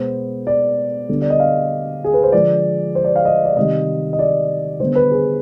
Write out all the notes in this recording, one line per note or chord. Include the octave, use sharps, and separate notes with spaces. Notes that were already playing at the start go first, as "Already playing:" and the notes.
Already playing: B2 G#3 B3 C5
D5
D3 G3 B3
D5
D#5
F5
G#4
B4
C5
D3 F3 G#3 D5
C5
D5
F5
D#5
D5
C3 D#3 G3 D#5
D#5
D5
D3 G3 B3 C5
B4
G#4